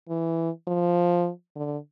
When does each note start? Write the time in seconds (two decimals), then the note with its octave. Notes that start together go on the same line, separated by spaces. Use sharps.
0.08 E3
0.67 F3
1.56 D3